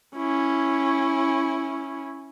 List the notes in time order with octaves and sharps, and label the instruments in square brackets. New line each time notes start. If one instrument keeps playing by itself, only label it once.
[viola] C#4 E4